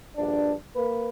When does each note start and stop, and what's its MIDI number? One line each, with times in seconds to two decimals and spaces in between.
0.17 0.53 34
0.17 0.53 43
0.17 0.53 62
0.76 1.09 58
0.76 1.09 71